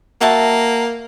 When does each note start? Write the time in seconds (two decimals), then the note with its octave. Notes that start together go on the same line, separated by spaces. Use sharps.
0.21 A#3 F#4 E5 A5